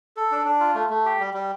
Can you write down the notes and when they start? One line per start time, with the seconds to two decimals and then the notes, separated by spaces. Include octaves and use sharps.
0.17 A4
0.32 D4
0.45 D4
0.60 F4
0.75 A3
0.90 A3
1.05 G4
1.20 G3
1.34 G3